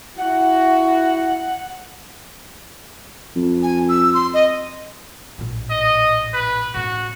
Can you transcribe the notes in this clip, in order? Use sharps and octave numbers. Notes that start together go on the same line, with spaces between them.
E4 F#4 F#5
F2
G#5
E6
C6
D#5
A#1 A2
D#5
B4
A2 C#3 F#4